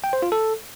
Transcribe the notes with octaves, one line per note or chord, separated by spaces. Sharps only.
G5
C5
F4
A4